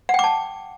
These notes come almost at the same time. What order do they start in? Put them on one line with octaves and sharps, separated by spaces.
F#5 G5 D6 A5